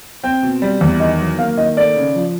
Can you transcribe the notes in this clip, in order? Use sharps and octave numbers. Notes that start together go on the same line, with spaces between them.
C4 G5
B2
G3
E2
D#3 D#5
F#3
A#3 F5
D#3 D#5
A3 D5
C#3
F3